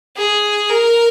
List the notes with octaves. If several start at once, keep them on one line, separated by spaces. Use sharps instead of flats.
G#4
A#4